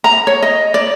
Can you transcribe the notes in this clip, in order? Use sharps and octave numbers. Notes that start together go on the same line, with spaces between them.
A#5
C#5
D#5
D5